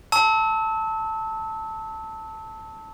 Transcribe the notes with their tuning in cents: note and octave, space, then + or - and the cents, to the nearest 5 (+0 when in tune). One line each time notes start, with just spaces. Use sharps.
A5 +5 C#6 +5 E6 -30